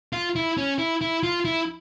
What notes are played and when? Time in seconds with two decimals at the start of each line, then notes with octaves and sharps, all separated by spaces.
0.13 F4
0.36 E4
0.57 C#4
0.78 E4
1.01 E4
1.23 F4
1.45 E4